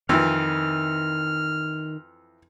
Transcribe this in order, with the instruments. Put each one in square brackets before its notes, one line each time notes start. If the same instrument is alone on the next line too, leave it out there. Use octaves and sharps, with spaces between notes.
[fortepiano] F2 E3 [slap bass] D#3 [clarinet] F6